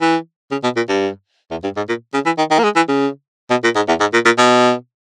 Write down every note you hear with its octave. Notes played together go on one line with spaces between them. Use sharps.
E3
C#3
B2
A#2
G2
E2
G2
G#2
A#2
C#3
E3
D#3
D#3
A#3
G#3
E3
C#3
B2
A#2
G#2
E2
G#2
A#2
A#2
B2